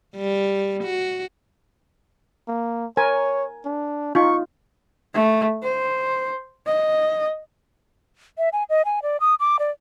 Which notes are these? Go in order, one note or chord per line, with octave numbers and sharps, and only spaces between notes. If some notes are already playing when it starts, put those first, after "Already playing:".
G3
F#4
A#3
A#4 C#5 G#5
D4
D#4 F4 C#6
A3
C5
D#5
E5
G#5
D#5
G#5
D5
D#6
D6
D5